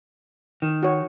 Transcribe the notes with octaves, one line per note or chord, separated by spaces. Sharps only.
D#3
F#4 C#5